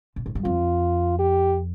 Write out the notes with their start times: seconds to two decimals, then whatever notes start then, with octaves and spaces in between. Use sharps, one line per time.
0.16 A#2
0.26 A2
0.35 G2
0.44 F2 F4
1.19 G4